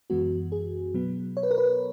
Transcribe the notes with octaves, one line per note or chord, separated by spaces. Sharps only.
F#2 E3 G#3 B3 F#4
G#4
B2 F#3 B3
C#5
B4
A#4
B4